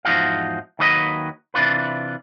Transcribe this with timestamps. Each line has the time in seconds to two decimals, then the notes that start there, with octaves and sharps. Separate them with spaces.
0.05 E2 G#2 F3 D#4 F#4 F5
0.79 D#2 D#3 F#3 B4 D#5
1.54 C3 E3 D4 F4 B4